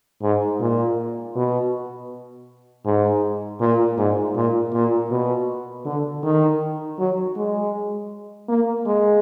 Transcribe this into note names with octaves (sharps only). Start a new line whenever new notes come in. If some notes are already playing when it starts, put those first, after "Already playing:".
G#2
A#2
B2
G#2
A#2
G#2
A#2
A#2
B2
D3
D#3
F#3
G#3
A#3
G#3